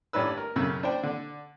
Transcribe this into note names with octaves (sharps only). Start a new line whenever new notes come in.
A1 G2 C#4 D4 B4 E6
A#4
B1 F#2 C#3 E6
D4 C5 G5
D3